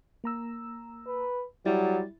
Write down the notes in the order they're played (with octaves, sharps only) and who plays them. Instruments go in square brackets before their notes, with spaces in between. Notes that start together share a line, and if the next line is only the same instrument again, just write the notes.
[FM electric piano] A#3 A#5 E6
[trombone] B4
[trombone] F#3 [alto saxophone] G3 [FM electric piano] E4 A6